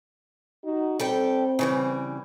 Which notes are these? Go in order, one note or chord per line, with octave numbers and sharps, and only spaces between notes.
D#4 F#4
G3 C4 A4 G5
C#3 E3 G3